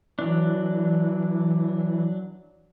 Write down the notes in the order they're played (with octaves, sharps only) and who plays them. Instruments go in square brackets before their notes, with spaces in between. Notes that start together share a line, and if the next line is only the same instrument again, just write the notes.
[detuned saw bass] E3 [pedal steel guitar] F#3 D4